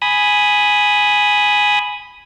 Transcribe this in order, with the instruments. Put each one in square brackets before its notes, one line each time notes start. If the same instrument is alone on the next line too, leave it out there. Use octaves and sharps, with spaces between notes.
[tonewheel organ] G#5 B5 D#6